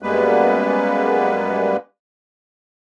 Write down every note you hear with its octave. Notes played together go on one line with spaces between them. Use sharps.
F#2 G3 G#3 A#3 B3 B4